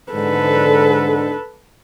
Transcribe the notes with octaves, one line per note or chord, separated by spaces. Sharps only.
G#2 D3 A4 B4